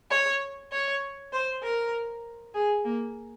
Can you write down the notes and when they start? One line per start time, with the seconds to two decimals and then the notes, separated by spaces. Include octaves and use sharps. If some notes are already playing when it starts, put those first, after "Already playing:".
0.11 C#5
0.72 C#5
1.33 C5
1.63 A#4
2.54 G#4
2.85 A#3